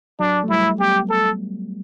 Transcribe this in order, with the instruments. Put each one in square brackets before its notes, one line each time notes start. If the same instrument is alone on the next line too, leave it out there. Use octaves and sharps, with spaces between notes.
[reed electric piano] F#3 [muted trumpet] D4
[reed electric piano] A3
[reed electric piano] G3 [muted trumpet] E4
[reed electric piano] B3 [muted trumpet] G4
[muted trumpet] A4